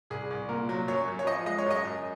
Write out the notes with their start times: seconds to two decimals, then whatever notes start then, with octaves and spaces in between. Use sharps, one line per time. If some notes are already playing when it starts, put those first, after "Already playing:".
0.10 C2 G#4
0.30 C2
0.49 A#2 A#4
0.69 F#3
0.88 F#2 C#5
1.08 F#2
1.19 C#5
1.27 F3 D#5
1.46 G#3 D#5
1.58 C#5
1.66 F#2 D#5
1.85 F#2